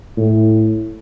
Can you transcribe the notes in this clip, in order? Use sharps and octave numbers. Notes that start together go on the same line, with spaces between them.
A2